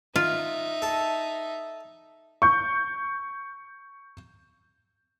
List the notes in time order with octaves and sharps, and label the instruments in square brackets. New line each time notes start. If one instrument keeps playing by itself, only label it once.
[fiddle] D#4 E5 [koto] F4
[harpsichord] A4
[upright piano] C#6 G6